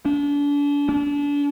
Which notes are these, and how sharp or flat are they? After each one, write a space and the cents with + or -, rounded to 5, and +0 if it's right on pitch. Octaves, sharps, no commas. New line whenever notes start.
D4 -35
D4 -30